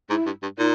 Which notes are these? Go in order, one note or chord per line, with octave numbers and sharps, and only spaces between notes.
G#2 E4
G2
G2
A#2 D#4